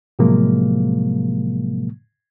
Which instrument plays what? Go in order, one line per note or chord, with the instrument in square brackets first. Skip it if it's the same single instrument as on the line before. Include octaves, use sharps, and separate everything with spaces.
[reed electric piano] A2 C3 F3 F#3 G#3 A#3